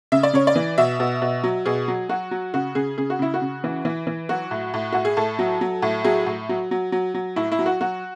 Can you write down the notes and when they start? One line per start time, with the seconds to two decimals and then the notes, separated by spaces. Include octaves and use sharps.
0.12 C#3 E5
0.23 D5
0.33 C#3 C#5
0.47 D5
0.56 E3
0.78 B2 E5
1.00 B2
1.22 B2
1.44 F#3
1.66 B2 G#4
1.88 F#3
2.09 F#3 F#4
2.31 F#3
2.54 C#3 F#4
2.75 C#3 G#4
2.98 C#3 G#4
3.10 F#4
3.19 C#3 E4
3.34 F#4
3.41 C#3
3.64 E3
3.85 E3
4.07 E3
4.29 F#3 F#4
4.51 A2
4.74 A2
4.93 A2 F#4
5.05 G#4
5.17 A2 A4
5.39 F#3
5.61 F#3
5.82 A2
6.04 F#3 G#4
6.26 A2
6.49 F#3
6.71 F#3
6.92 F#3
7.14 F#3
7.36 A2 E4
7.52 E4
7.59 F#3
7.66 F#4
7.81 F#3 F#4